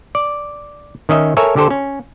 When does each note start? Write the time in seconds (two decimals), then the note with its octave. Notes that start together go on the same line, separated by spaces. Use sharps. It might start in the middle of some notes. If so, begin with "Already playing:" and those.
0.15 D5
1.09 D#3 C#4 D#5 E5
1.37 A4 A#4 C#5 E5 G#5
1.56 D3 G4 A4 C5
1.70 C#4